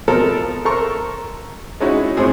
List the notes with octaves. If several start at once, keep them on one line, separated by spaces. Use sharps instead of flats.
B2 F3 A4 A#4
A4 A#4 C5 A#5 C6 C#6
G#3 C#4 D#4 E4 F#4
A2 G#3 C4 E4 G#4